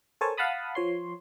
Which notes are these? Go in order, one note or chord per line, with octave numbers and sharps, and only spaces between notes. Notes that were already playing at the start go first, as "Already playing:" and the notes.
A4 A#4 C5 C#5 G#5 A5
F5 F#5 A5 B5 D#6
F3 C#5 C6